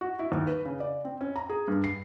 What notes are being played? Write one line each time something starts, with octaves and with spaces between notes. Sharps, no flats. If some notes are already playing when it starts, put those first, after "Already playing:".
F#4
E4
D#2
B4
C#3
D5
C4
C#4
A#5
G#4
G2
C7